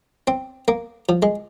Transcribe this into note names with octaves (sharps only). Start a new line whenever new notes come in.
C4
A#3
F3
G#3